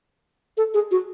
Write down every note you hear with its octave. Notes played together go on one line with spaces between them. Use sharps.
A4
G#4
F#4